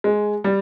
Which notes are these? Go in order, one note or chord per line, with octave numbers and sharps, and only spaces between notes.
G#3
G3